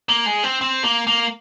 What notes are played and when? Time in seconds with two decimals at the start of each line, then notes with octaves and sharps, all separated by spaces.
0.09 A#3
0.26 G#3
0.44 C4
0.61 C4
0.84 A#3
1.07 A#3